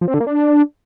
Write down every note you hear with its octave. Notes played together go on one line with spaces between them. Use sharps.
F3
C4
D3
A#3
D4